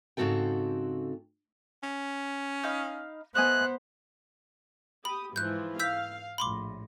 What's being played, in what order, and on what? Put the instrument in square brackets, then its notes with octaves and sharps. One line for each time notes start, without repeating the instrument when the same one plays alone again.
[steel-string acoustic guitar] G#2 C#3 C4 F#4 A4 G5
[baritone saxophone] C#4
[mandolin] D#4 F5 B5
[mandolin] A3 D#5 G#5 [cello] B3 C5 [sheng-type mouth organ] F#6
[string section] G4 D#6 [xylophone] B5
[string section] G#2 E3 F3 [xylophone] F#6 G6
[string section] F5 [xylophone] E6 G6 B6
[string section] A#1 A2 [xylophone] B5 C6 D6